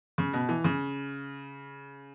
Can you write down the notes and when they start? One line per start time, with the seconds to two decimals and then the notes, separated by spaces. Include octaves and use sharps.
0.18 C#3
0.33 B2
0.49 E3
0.64 C#3